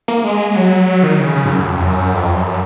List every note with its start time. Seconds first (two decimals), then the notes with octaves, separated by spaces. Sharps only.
0.08 A#3
0.24 G#3
0.56 F#3
0.87 F#3
1.03 D#3
1.19 C#3
1.35 C#3
1.45 G#2
1.50 F#2
1.66 F2
1.82 F#2
1.98 F#2
2.14 F2
2.35 F#2